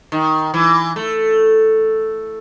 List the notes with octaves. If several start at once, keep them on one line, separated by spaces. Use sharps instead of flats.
D#3
E3
A3